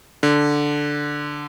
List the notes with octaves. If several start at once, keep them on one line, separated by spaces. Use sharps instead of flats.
D3